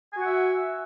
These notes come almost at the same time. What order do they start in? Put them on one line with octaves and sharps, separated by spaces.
G#5 F#4 F#5 E5